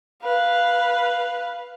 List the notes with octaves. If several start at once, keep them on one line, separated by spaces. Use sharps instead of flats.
B4 F5